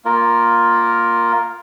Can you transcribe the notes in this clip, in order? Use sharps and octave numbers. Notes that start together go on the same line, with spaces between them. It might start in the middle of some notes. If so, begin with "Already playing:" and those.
A#3 F4 A#4